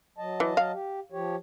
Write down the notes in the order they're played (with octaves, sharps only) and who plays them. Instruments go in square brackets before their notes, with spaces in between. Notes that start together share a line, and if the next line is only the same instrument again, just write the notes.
[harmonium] F#3 D#5 A5
[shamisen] E3
F5
[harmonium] G4
F3 G4 C#5